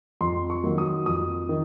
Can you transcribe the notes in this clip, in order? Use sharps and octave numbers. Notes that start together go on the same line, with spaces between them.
F2 C6
C#6
D#3 F#3 A#3
D#6
F2 D#6
D#3